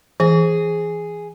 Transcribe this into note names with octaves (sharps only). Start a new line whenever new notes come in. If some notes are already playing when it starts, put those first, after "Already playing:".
E3 G#4